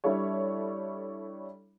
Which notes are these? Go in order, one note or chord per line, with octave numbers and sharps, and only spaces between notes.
G3 D4 E4 A4 C#5